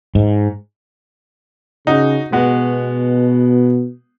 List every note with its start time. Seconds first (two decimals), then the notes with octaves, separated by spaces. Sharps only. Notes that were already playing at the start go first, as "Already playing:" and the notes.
0.15 G#2
1.87 C#3 D#4 F#4
2.32 B2 G#3 B3 F#4